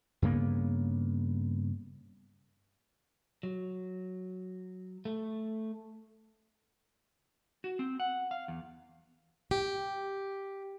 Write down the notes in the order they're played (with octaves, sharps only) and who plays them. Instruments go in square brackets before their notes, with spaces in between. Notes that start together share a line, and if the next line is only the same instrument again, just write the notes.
[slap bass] G2 C#3 A#3 B3
[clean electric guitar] F#3
A3
F#4
C4
F#5
F5
E2
[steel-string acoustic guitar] G4